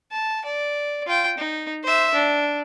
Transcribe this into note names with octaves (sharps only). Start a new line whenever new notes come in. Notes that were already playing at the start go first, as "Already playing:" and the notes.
A5
D5
F4 G5
D#4
C5 E5
D4